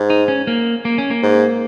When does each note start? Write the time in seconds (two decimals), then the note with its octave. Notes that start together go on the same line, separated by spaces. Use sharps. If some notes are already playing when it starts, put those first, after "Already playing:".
Already playing: G#2
0.10 D#4
0.28 C#4
0.47 A#3
0.85 A#3
0.98 C#4
1.10 A#3
1.23 G#2